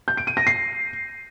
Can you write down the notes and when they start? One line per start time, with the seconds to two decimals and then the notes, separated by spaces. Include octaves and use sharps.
0.08 G6
0.17 D7
0.27 D#7
0.37 A#6
0.47 C7